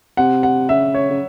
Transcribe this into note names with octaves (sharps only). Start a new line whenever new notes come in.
C3 F#5
F#5
C#3 E5
C#5
C#3